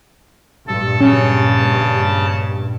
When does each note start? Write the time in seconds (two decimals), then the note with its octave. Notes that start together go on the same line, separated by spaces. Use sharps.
0.68 A#1 G2 A4
1.01 C#3 C#4 A5